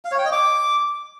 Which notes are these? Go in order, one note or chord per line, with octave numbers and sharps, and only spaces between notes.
F5
C#5
G5
D#5
D6